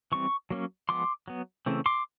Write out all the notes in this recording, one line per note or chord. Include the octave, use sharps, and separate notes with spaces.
E3 G3 C4 C#6
F#3 A#3 C#4
F3 G#3 B3 C6 D6
F#3 B3
C#3 E3 A3 C4
C6 D6